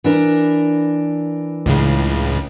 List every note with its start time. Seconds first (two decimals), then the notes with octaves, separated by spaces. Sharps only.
0.04 E3 D4 A#4
1.66 C#2 A2 C#3